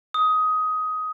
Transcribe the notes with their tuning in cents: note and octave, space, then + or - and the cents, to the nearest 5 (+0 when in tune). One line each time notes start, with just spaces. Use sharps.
D#6 +15